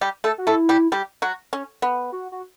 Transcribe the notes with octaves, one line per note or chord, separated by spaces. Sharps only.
G3 G4
A3 A4
F#4
A3 E4 A4
G3 G4
G3 G4
F#3 F#4
C#4
B3
F#4
F#4